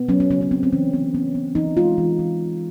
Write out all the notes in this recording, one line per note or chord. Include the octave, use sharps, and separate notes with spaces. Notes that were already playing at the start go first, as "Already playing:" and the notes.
Already playing: B3
F#3 C#4
C#4
C#3 C#4
C#4
B3 C4
C4
E3 C#4
B3 C4
B3 C#4
B3
E3 D#4
G#3 F4
E3
E3